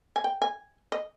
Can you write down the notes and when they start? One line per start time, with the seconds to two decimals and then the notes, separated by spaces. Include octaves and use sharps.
0.16 G#5
0.24 G5
0.42 G#5
0.92 D#5